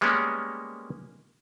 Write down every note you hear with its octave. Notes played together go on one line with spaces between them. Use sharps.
G3 G#3 A#3 B3 C#4 A#4